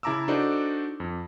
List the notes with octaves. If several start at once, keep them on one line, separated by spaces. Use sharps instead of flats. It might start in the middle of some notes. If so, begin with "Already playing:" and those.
C#3 E4 A5 A#5 D6 E6
D4 D#4 F#4 A4 C5 D5
F2